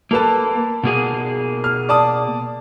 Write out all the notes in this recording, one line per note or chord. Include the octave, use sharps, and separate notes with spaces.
A#3 A4 B4 A5
B2 A#3 G#4
F6
D5 A5 D#6